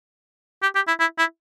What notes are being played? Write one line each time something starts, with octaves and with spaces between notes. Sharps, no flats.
G4
G4
E4
E4
E4